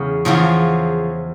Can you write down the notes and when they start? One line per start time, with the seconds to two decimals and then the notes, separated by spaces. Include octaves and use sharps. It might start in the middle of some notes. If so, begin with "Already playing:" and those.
Already playing: E2 C#3
0.25 E2 C#3 F3